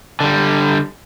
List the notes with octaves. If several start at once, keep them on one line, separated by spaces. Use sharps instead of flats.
D3 G3